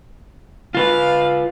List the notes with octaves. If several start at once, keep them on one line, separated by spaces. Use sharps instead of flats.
F4 B4 F5